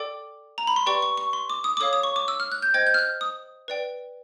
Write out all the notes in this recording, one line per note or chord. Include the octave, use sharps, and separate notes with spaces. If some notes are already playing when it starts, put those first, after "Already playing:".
Already playing: A4 D5 G5 D6
A#5
B5
C6
G4 B4 D5 G5 C#6
C#6
C#6
C6
D6
D#6
D6
A4 C#5 F5 D#6
D#6
C#6
D6
E6
F6
F#6
G6
C5 D#5 G5 G#6
G6
F6
F#6
D#6
B4 D5 G5